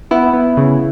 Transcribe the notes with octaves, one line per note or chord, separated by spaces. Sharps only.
B3 E4
B3
C#3